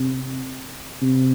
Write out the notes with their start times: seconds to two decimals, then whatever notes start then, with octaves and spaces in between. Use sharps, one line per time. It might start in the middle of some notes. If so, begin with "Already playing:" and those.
Already playing: C3
1.02 C3